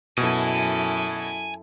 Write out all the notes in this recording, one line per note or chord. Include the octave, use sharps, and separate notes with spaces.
F#2 B2 E4 A4 G#5